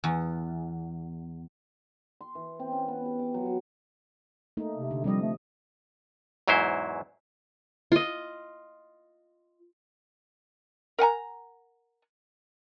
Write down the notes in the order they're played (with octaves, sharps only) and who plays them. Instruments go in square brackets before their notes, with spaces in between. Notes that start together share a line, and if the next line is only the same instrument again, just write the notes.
[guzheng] E2
[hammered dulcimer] C6
E3
C4
C#4
B3
G4
D6
F#3
F#3
[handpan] A3 A#3 D#4
[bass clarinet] C3
[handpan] D3
[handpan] C3 F3 D#5 [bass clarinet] G3
[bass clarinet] A3
[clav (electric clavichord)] E2 G#2 F#3 E4 C5
[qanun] F4 D#5
[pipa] A#4 F#5 G#5 A#5